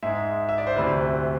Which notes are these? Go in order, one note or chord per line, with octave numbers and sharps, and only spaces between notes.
G#2 G#3 E5
E5
D5
C5
D2 C3 E3 B4